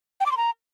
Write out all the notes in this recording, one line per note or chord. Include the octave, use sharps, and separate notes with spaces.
G5
D6
C6
A#5